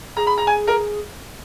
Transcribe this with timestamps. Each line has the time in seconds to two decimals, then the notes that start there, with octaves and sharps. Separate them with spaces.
0.17 G#4 A#5
0.27 B5
0.38 A#5
0.47 G#5
0.67 A#4